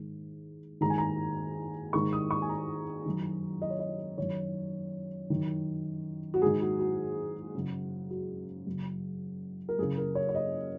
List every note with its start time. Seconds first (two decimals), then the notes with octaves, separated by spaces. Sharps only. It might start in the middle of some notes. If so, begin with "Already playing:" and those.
Already playing: G#2 D#3
0.81 G#2 D#3 A#5
0.90 G#5
0.98 A#5
1.93 G#2 D#3 C#6
2.13 D#6
2.31 C#6
2.42 G#5
2.49 A#5
3.05 F#2 D#3
3.62 D#5
3.70 C#5
3.79 D#5
4.17 F#2 D#3 C#5
5.30 F#2 D#3
6.34 F#4
6.42 G#2 D#3 G#4
6.61 F#4
6.79 F#4
7.55 F#2 C#3
8.10 F#4
8.67 F#2 C#3
9.69 A#4
9.78 F#2 C#3 G#4
9.97 A#4
10.15 C#5
10.29 C#5
10.35 D#5